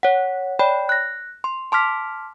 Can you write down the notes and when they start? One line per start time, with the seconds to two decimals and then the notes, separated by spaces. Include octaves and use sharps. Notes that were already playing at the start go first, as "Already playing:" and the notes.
0.03 C#5 F#5
0.59 C#5 D5 G5 B5
0.89 F#6 A#6
1.44 C6
1.72 A5 C6 D6 F6 B6